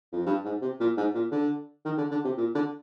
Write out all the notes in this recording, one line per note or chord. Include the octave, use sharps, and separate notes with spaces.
F2
G2
G#2
C3
A#2
G#2
A#2
D3
D#3
D3
D3
C3
A#2
D3